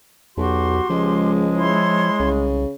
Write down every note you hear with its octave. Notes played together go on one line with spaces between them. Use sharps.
B1 E2 F#4 G4 C6
C#2 F3 G#3
E4 C#5 C6
C2 C#3